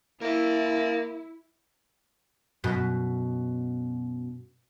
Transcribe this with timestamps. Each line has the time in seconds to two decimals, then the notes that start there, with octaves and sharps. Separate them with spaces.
0.21 A#3 E4 A#4 E5
2.64 F#2 B2